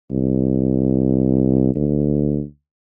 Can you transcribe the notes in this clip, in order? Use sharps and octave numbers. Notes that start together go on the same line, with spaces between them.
C2
D2